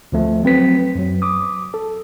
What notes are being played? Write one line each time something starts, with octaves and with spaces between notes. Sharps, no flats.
D2 F3 A3
F#3 C4 B4 B6
F#2 F#3
D6 D#6
A4